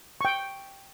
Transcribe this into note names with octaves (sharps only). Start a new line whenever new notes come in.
G5 C#6